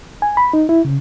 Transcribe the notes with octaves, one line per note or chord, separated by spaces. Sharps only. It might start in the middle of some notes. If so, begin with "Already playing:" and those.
G#5
B5
D#4
E4
C#3